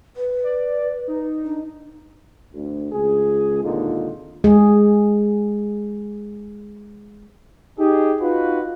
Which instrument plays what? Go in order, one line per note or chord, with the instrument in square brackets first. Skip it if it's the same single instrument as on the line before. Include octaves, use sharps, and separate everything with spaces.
[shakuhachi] B4
[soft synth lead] D5
D#4
[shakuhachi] D4
[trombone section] D2
C#2 G#4
G#1 D#2 A#2 D3 D#4 F4
[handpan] G#3 G#4
[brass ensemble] D#4 G4 G#4
D#4 F4 F#4 B4